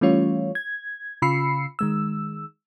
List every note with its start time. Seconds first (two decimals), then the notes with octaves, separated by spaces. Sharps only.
0.01 E3 G3 A3 C#4 F4 C#5
0.55 G#6
1.22 C#3 F4 B5 E6 C7 C#7
1.79 D#3 G#3 E6